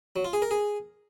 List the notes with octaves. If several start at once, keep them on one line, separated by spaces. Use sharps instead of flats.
F#3
F4
G#4
A#4
G#4